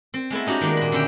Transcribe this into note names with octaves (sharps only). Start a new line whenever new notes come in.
C4
G#3 A3 B3 E4
C#4 D#4 F#4 G4
D#3 G#3 A#3 D4
A#2 B5
D3 C#4 E4 G5